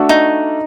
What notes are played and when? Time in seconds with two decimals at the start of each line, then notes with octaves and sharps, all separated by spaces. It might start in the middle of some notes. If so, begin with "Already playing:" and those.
Already playing: A3 D4 F#4 A4
0.09 D#4